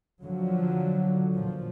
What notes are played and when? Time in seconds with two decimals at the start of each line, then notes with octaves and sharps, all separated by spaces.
0.22 D3 F3 F#3
1.33 A#2 F3